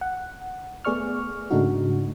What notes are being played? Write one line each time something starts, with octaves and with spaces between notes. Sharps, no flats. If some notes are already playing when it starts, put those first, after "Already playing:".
F#5
A3 B3 G#4 D5 C#6 F6
G#2 C#3 A3 D4 D#4 F#4